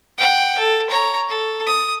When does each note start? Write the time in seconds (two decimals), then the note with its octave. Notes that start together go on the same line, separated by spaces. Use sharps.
0.18 F#5 G5
0.59 A4
0.90 C#5 A#5
1.29 A4
1.67 D#6